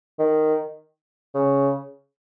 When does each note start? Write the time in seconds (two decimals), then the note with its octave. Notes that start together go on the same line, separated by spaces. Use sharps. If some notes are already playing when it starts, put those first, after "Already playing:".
0.19 D#3
1.35 C#3